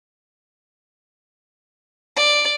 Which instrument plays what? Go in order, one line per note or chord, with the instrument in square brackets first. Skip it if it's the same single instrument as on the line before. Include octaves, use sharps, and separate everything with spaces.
[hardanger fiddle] D5